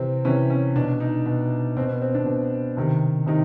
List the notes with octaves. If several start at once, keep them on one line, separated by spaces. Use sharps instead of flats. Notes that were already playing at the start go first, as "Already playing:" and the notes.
Already playing: C3 E3 C4
C3 E3 C#4
C#4
B2 D4
D#4
B2
B2 C4
B3
C4
D4
B2
C3 D#3
C3 D#3 D#4